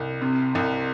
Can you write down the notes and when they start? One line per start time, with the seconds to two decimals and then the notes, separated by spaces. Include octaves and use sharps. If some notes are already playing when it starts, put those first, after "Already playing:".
Already playing: C2
0.22 C3
0.55 C2